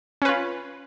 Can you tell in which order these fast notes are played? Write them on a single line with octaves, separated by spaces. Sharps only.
C#4 B4 F4